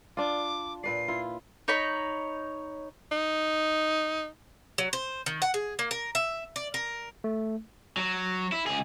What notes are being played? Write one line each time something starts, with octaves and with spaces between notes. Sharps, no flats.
D4 F4 D6
A#2 B4 D5 C7
E4 F4
D#4 C#5 B5
D#4
F#3
C5
D#3
F#5
G#4
A#3
A#4
E5
D5
A#4
A3
F#3
E4
C#2 G#4